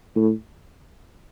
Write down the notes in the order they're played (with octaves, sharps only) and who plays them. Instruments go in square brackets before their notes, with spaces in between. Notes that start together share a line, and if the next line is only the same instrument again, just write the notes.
[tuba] A2